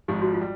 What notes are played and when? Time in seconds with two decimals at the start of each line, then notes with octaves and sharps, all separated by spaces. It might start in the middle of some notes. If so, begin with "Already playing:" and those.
0.08 G#1 G#2 F3 G4
0.22 F#4
0.34 F4
0.41 G3